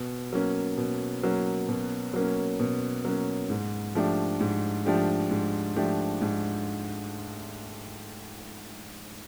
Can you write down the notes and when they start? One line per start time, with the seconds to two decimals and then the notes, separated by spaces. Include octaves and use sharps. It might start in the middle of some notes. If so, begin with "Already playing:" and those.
Already playing: B2
0.33 F#3 A#3 C#4
0.78 B2
1.23 F#3 A#3 C#4
1.69 B2
2.14 F#3 A#3 C#4
2.60 B2
3.05 F#3 A#3 C#4
3.50 G#2
3.95 F3 A3 D4 G4
4.41 G#2
4.86 F3 A3 D4 G4
5.31 G#2
5.76 F3 A3 D4 G4
6.22 G#2